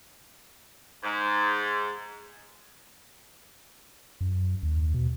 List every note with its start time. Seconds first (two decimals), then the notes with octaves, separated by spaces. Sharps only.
1.03 G#2
4.21 F#2
4.63 D#2
4.94 B2